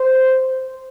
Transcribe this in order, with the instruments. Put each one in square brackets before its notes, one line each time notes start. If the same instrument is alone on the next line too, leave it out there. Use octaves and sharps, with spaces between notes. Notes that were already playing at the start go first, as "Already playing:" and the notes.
Already playing: [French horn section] C5